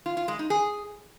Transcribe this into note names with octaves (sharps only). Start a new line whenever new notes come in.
F4
F4
G#3
D#4
G#4